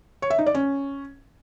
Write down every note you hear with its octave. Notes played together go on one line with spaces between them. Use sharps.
C#5
E5
D#4
D5
C#4